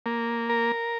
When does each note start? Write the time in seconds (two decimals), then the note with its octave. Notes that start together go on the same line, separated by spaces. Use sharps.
0.06 A#3
0.50 A#4